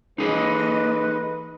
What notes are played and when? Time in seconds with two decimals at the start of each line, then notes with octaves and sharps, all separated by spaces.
0.18 E3 A#3 D#4 G#4 A4 B4 D#5